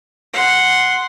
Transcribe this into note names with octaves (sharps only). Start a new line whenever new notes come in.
F#5 C6